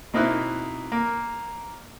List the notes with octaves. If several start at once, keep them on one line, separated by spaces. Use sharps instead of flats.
B2 A#3 C4 D#4 E4 F#6
A#3